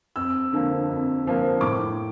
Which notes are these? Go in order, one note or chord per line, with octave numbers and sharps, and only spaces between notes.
F2 E6
D3 F3 A#3
F2
D3 F3 A#3
A2 D6